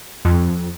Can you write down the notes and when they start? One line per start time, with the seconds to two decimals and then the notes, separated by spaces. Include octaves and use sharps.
0.25 F2